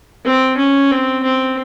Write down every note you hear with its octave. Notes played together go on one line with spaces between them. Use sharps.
C4
C#4
C4
C4